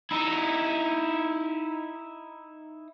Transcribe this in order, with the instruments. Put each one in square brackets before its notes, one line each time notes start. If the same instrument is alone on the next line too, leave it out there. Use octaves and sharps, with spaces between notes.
[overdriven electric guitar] D#4 E4